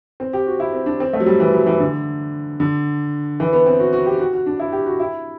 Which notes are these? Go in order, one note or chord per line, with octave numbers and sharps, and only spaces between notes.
C4
G4
F#4
E4
C4
D4
C4
A3
F#3
G3
E3
F#3
E3
D3
D3
E3
B3
C4
F#4
F#4
G4
F#4
F#4
D4
E4
G4
F#4
E4